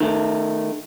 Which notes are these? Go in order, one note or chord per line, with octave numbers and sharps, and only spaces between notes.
D#3 A3